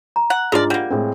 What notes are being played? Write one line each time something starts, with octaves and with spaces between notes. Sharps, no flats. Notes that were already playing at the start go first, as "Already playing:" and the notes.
A#5
F#5
G#2 D4 F4 G#4 A#4 D5
G3 A#3 F#5
A2 G#3 C4